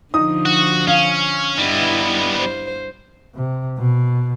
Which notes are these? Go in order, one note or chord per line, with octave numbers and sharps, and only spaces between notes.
D3 F3 D#4 D#6
F#4
C#4 F5
G2 G3 B3 E4 D#5
C5
C3
B2